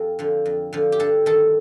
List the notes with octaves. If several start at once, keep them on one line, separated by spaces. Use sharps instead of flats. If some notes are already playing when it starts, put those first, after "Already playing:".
Already playing: F2 G4 A4
D3 F3
F2
D3 F3
G4
G2 A4
D#3 A4